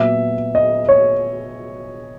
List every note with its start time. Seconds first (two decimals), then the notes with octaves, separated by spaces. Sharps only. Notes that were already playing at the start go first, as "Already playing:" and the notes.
Already playing: A#2 F#3 B3 E5
0.55 D#5
0.89 C#5